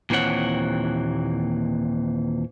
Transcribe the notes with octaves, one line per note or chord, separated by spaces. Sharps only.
D#2 A#2 E3 C4 C#5 F#5